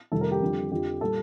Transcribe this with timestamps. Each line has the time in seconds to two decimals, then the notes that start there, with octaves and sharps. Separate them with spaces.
0.11 F2 C3 D#3 G3 A4
0.21 A#4
0.31 G4
0.42 F2 D3 G3
0.71 F2 D3 F3 G4
1.01 A#2 G3 A4